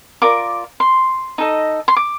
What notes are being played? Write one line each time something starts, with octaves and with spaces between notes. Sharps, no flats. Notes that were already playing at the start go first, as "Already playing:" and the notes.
F4 A#4 D5 D6
C6
D#4 A4 D#5
C6
D6